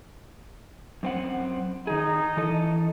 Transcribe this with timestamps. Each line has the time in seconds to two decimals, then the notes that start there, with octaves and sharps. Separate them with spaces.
1.03 F#2 C4 F#5
1.87 D#3 D#4 G#4
2.37 E3 A4 D#5